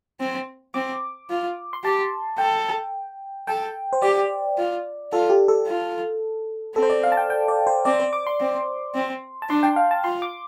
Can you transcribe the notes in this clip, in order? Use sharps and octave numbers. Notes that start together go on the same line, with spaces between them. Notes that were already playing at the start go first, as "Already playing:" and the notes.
C4
C4 D6
F4
C6
G4 A5
A4 G5
A4 G5
C5
G4 D5
F4
F4 A4
G4
A4
F4
C4 A4
C5
D5
F5
A5
G5
G5
D5
C5
C4 D5
C5
D6
C6
C4
C4
A5
D4 C6
G5
F5
A5
F4 C6
D6